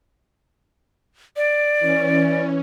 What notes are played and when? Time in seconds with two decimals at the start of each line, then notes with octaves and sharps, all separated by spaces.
1.37 D5
1.79 E3 C#4